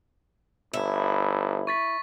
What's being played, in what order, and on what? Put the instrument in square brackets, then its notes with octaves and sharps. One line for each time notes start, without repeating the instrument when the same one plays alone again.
[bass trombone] G1 [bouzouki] E4
[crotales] C#6 A6 B6